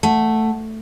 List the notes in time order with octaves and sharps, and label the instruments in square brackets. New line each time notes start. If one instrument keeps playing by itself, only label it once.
[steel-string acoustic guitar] A3 [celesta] F#5 A5